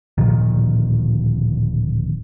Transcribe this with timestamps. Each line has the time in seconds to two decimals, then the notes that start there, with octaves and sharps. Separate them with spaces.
0.18 D1 A#2 D#3 F3